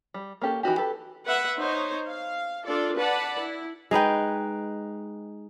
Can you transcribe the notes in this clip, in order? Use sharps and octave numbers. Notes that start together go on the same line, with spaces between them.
G3
A#3 C#4 G4 A4
E3 D#4 F#4 G4
G4 A4 B4
B4 E5 F#5
D#4 C5 C#5
F5
D4 F4 A4 D5
B4 D5 F#5 A5 B5
E4
G#3 D#4 B4 G5